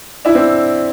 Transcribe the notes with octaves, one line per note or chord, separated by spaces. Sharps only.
D4 E4
C4 D4